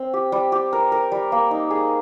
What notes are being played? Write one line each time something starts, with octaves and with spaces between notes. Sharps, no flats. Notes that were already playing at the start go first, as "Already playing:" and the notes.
Already playing: C4
G4
G3
G4
A#4
A#4
G3
A#3
D#4
G#4